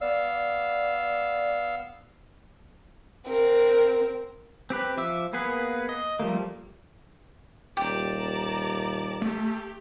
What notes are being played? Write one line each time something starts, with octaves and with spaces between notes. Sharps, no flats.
B3 D5 F5 E6
C4 A#4
C4 G4 B4
F3 E5 D6 E6
A#3 B3 G#4 B4
D#5
F3 G3 A3 A#3
D#1 G4 D5 A5 A#5
A3 G4